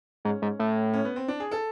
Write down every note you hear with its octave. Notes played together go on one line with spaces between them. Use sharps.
G#2 C#4
G#2
A2
C#4
B3
C4
D4
G#4
A4